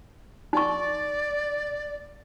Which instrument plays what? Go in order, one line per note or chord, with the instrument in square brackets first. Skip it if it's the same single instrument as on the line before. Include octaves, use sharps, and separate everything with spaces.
[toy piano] D#4 C#6 [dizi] D5